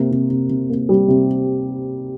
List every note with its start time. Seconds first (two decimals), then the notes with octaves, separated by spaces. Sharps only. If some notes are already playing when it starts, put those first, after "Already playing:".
Already playing: C3 A#3
0.11 C3
0.30 C3
0.49 C3
0.70 A#3
0.89 G3
1.08 C3